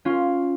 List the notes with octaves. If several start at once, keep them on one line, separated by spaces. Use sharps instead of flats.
C#4 F4